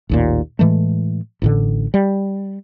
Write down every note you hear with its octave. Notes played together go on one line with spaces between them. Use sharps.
A1 D#2 A#2
A2 E3 G#3 A3
A1 A2 D3
G3